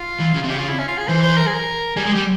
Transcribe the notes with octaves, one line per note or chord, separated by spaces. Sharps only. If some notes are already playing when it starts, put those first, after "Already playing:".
Already playing: F4
E3
C#3
C3
C#3 G4
F4
E4
C#4
F4
G#4
E3 C5
C5
A#4
G#4
A#4
G3 G#4
G#3
G3 G4